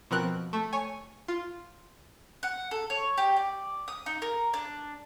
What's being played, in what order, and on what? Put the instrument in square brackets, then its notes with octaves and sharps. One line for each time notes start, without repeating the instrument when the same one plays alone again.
[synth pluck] B2 F3 C4 A#4 F#6
A3
C#5 G#5
F4
[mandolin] F#5
A4
C#5
G4
D5
D#6
D#4
A#4
D4